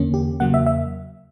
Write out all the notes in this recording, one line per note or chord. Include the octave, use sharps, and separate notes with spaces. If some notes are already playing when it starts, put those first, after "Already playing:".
Already playing: E2 D3 A#3 C#4
G4
E2 C#3 F#3 A#3 F#5
E5
E5